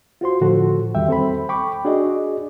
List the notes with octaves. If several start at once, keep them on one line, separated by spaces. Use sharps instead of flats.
F4 F#4 C5 C6
A2 D3 F3 F#4 A4
E2 D#3 G3 E5 G5
C4 A4 C5 B5
G5 B5 C#6 D6
D4 F#4 G#4 D5 D#5